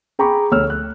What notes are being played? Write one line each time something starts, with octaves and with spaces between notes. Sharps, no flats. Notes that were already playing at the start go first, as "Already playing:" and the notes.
G#4 G5 A#5 B5 C#6 D6
D2 C#5 E6 F6
F#6